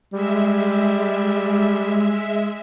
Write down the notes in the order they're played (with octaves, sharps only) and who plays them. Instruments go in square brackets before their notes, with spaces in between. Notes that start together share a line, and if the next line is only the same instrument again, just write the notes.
[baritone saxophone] G3 [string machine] G#3 E5